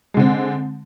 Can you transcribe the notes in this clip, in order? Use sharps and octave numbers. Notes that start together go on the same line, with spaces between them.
D3 G#3 C4